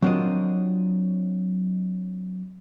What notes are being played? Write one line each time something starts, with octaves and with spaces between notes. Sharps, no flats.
F#3 C4 D4 F4 A#4 D#5